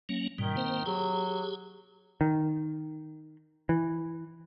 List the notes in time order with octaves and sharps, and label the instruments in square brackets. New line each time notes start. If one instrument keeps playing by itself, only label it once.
[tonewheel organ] F#3 A#3 C#4
[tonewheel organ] G#2 B2 G3 [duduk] D#3
[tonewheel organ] A#3 C4 C5
[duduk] F#3 [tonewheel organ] G4 G#4
[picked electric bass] D#3
E3